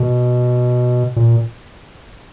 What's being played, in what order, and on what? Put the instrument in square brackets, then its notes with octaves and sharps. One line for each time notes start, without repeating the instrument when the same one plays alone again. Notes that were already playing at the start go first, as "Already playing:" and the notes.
Already playing: [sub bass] B2
A#2